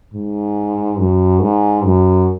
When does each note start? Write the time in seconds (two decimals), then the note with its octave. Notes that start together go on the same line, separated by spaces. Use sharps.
0.14 G#2
0.99 F#2
1.42 G#2
1.85 F#2